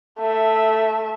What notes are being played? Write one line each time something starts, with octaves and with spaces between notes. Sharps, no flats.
A3 E5